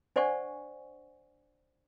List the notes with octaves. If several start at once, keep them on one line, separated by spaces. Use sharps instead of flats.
D4 C5 D5 F#5 G#5 C#6